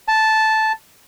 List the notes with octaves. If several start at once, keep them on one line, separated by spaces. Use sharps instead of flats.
A5